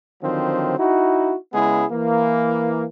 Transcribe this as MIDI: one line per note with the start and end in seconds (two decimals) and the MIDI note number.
0.23 0.75 50
0.23 0.75 51
0.23 0.75 53
0.23 0.75 54
0.23 0.75 60
0.78 1.35 63
0.78 1.35 64
0.78 1.35 66
1.53 1.84 49
1.53 1.84 56
1.53 1.84 59
1.53 1.84 64
1.53 1.84 68
1.92 2.85 52
1.92 2.85 58